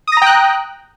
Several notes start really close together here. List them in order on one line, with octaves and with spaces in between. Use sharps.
D#6 A#6 A#5 G5 F#6